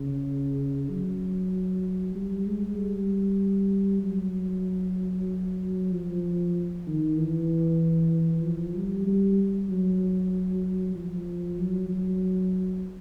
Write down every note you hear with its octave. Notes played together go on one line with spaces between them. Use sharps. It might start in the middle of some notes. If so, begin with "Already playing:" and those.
Already playing: C#3
F#3
G3
G#3
G3
F#3
F3
D#3
E3
F3
G3
G3
F#3
F3
F#3
F#3